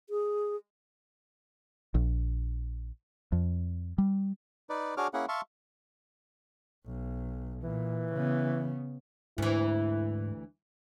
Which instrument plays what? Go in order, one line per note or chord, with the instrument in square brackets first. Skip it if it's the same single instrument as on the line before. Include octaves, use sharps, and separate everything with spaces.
[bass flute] G#4
[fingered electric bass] A#1
F2
G3
[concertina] D#4 B4 D5
D4 F#4 G#4 C#5 D6 F6
A#3 C#4 E4 G#4 F#5
E5 F5 A5 C6 C#6
[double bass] B1
[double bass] A#2 [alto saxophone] E3
[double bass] C#3 B3
[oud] D2 E3 [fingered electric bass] G#2 [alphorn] E4